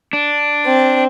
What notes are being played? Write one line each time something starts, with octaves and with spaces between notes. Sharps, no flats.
D4
C4